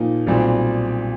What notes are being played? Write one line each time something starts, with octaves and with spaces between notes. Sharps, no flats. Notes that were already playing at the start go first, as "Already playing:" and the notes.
Already playing: A#2 F3 A#3 D#4
B1 A#2 G3 C4